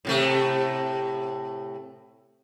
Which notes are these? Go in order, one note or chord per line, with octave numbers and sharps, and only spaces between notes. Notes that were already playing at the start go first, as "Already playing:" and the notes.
A2 C3 A3